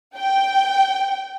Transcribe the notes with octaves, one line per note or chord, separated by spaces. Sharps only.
G5